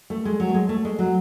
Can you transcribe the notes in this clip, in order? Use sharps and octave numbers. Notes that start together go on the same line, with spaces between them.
A3
G#3
F#3
A3
G#3
A3
G#3
F#3